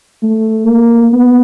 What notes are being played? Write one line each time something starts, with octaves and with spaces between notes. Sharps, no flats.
A3
A#3
B3